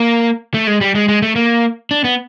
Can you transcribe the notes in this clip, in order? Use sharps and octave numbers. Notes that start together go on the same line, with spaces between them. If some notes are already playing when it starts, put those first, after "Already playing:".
Already playing: A#3
A3
G#3
G3
G#3
G#3
A3
A#3
D4
B3